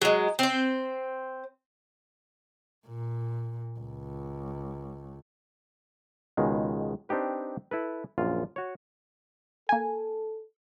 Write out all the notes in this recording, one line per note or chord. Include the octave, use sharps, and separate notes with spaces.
F#3 G#3
C4 C5
A#2
C#2
C#2 B2 D#3 G#3
C4 D4 D#4 G4 B4
E4 A4 B4
A#1 F#2 F4
F#4 C#5
A#3 A4 G#5